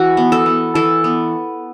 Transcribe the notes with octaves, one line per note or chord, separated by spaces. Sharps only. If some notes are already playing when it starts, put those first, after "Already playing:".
Already playing: E3 F#4
B3
A4
B3
E3 A4
B3